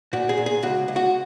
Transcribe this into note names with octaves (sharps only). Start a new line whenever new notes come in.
A#2 F#4
G#4
A#2
G#4
C#2 F#4
C#2
F#4